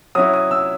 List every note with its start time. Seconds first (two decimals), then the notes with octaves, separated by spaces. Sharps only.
0.15 F#3 C#4 E4 D#6
0.33 D#6
0.51 E6